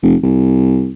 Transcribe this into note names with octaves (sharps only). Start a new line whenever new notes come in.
F1
C2